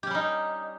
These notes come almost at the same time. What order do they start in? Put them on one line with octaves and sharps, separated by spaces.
G4 C#4 G3 D#4